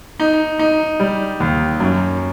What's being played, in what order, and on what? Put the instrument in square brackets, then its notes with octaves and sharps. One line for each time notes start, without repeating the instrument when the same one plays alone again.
[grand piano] D#4
D#4
G3
D#2
F#2